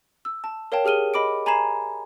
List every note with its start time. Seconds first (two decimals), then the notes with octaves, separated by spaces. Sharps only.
0.25 E6
0.44 A5
0.72 A#4 C#5 F5 G5 A5
0.85 G4 G#4 F6 D#7 G7
1.14 D#5 B5 D6 D7
1.46 G#5 A#5 B5 G#6 C7 E7